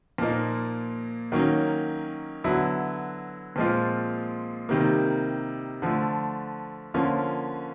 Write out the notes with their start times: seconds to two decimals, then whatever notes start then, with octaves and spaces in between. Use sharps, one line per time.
0.18 A#2 F3 A#3 D#4
1.32 D#3 F#3 A#3 C#4
2.44 D3 F#3 B3 E4
3.56 A#2 F3 G#3 C4 F4
4.69 C3 D#3 G3 A#3
5.82 D3 F3 A3
6.94 D3 F3 A#3 C#4 F4